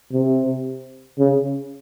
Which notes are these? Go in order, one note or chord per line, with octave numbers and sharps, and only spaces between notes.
C3
C#3